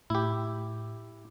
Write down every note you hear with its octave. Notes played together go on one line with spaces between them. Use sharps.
A2 E4 G4